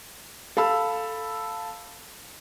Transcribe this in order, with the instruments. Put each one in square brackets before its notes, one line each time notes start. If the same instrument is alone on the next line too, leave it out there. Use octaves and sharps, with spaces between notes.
[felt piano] A4 F5 B5 E6